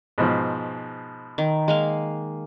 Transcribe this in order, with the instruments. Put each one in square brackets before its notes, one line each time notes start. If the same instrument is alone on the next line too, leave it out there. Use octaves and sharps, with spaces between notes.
[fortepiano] G#2 B2 F3
[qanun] D#3
G#3 A#3 F5